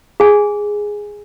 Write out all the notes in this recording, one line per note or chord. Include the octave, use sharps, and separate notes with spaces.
G#4 G#5